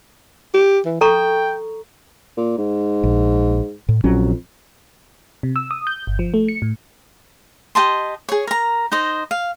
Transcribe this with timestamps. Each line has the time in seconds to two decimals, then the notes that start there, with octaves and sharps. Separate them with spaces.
0.54 G4
0.86 E3
1.01 A4 G5 A#5 C#6
2.37 A#2
2.58 G#2
3.04 A#1
3.89 A2
4.04 A#1 F2 F#3 C#4
5.43 C3
5.56 E6
5.71 D#6
5.87 G6
6.07 G1
6.19 F3
6.34 A3
6.48 C#7
6.62 A2
7.75 G4 D#5 A5 C6
8.29 G#4 C#5
8.47 A#4 A#5
8.92 D#4 C5 D#5
9.31 F5